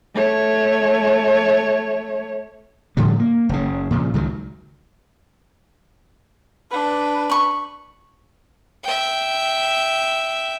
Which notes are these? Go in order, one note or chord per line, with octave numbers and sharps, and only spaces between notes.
A3 C#5
A2 D3 F3 G3
A#3
F#1 C#3
A#2 C#3 F3
C#2 D#3 F#3
D4 B4
B5 C#6
E5 G5